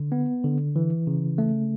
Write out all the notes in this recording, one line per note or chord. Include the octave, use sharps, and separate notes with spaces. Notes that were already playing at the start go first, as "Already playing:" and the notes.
Already playing: D3
B3
D3
E3
C#3
A3